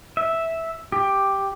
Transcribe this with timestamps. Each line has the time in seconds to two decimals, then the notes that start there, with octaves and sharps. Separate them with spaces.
0.17 E5
0.92 G4